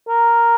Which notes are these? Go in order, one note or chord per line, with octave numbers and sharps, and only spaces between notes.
A#4